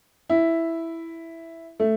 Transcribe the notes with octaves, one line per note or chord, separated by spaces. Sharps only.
E4
A3